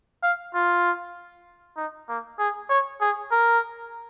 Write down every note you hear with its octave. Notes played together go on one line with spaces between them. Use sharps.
F5
F4
D#4
A#3
G#4
C#5
G#4
A#4